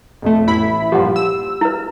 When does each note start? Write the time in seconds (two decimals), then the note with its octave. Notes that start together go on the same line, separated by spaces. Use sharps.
0.22 B1 F2 A3
0.47 A1 E4 B5
0.92 G2 A#2 F3 G4 F#5
1.16 E6
1.61 E4 B4